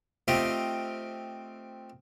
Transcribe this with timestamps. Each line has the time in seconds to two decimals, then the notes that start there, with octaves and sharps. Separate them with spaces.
0.28 A3 C4 F4 G4 D#5 F5